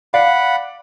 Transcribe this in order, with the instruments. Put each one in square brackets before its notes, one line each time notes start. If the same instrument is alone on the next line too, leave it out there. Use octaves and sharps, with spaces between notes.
[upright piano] D5 [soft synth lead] F5 [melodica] F#5 B5